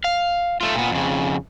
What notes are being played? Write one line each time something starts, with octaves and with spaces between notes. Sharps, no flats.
F5
A3 F4
A#2 B3
F2 C#3